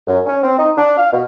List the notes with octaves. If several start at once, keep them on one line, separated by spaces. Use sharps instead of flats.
F#2
C#4
C4
D#4
D4
F5
B2